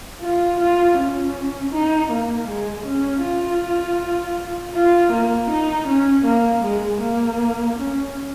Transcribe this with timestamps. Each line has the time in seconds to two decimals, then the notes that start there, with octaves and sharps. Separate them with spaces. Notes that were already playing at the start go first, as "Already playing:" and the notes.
0.21 F4
0.60 F4
0.97 C#4
1.73 D#4
2.10 A#3
2.48 G#3
2.86 C#4
3.24 F4
4.75 F4
5.12 A#3
5.50 D#4
5.88 C#4
6.25 A#3
6.64 G#3
7.01 A#3
7.78 C#4